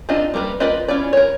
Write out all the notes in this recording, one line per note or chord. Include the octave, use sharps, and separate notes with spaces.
C4 D4 D#4 F4 D#5
G3 A#3 A#4 B4
F4 A#4 B4 D5 D#5
C#4 E4 F4 D5
A#4 C#5